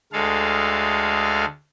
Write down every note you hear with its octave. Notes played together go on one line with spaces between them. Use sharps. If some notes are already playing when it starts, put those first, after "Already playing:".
D2 G#3 A4 F5